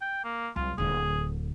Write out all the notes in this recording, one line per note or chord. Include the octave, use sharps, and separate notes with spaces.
G5
A#3
C2 F#3 F4
D1 D3 G#4